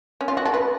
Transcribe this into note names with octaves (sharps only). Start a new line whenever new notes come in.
C#4
F4
F#4
A4
B4